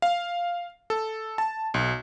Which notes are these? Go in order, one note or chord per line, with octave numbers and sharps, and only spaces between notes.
F5
A4
A5
B1